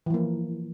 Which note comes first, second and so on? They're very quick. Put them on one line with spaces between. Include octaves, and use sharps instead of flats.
E3 F3 A#3